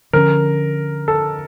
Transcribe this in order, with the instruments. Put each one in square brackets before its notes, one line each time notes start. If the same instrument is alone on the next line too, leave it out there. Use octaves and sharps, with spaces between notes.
[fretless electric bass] D3 F3 G#3 C#4 [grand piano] A#4
[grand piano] A4